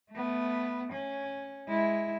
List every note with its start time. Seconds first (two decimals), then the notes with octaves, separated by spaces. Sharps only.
0.12 A3 B3
0.92 C#4
1.68 G#3 E4